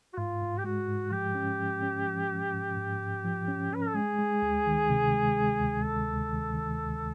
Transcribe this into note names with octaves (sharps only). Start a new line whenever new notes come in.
F#4
G#2 F4
G#2
G4
G#3 F#4
G#2
F3 G4
C#4
F3
C#4
F3
F3
G#2
G#2
G#2
F3
C#4
C#4 B4
A#4
A4
G#3 G#4
G#3
D2
D#3
C3
G#3
G#3
D2
D2 A4
D2
D#3
D#3
D2